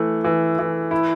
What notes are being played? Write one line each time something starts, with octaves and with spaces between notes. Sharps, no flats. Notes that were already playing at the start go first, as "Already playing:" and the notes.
Already playing: E3 A3
E3
E3
E4